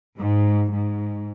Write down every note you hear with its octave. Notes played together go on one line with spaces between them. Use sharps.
G#2
G#2